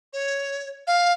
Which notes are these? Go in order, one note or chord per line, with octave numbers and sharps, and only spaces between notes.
C#5
F5